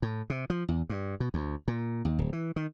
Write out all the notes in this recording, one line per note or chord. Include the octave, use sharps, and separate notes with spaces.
A2
C3
F3
E2
G2
B2
D2
A#2
D#2
D1
E3
D#3